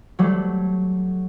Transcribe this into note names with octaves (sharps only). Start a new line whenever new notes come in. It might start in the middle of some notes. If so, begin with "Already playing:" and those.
F#3 G3 A3